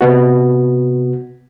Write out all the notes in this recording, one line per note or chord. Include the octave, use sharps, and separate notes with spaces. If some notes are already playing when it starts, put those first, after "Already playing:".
C3 B3 F#4